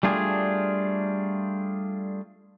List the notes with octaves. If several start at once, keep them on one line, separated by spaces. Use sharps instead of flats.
G3 A3 D4 F4 G#4